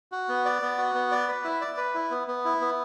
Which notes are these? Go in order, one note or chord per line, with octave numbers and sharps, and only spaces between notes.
F#4
B3
D5
B3
F#4
B3
D5
B4
E4
D5
B4
E4
B3
B3
E4
B3